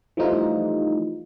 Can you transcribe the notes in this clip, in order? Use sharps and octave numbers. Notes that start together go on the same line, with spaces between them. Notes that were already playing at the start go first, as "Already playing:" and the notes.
E3 F3 G3 A3 D#4 F4